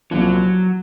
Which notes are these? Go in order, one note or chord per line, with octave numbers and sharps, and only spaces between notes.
C2 A#2 F3 F#3 C4